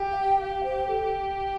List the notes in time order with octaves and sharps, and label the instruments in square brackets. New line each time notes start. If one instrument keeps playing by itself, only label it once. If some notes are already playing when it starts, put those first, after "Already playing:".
Already playing: [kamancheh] G4
[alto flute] F5
G5
[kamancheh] G4 [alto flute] F5
[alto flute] C5
A4